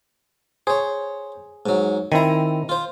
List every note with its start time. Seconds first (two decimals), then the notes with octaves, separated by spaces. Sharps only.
0.67 G#4 C5 C#5
1.66 G#2 F#3
2.12 D#3 C4 E4 G#5 A#5
2.69 F4 C5